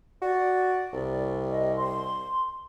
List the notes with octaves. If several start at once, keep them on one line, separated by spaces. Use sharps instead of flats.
F#4 D5
C2
D#5
C6